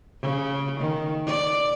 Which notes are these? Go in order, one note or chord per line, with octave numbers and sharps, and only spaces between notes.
C#3
D#3
D5